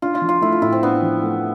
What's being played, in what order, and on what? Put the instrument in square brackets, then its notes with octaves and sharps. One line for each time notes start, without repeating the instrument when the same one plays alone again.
[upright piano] D4 [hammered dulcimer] F4
[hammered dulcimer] F4
[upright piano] F3
[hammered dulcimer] F4
[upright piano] A3 [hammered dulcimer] E4
[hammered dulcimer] F4
[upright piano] A2 [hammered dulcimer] E4
[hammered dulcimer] C4
[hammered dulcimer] B3 [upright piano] D4
[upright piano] F3
A3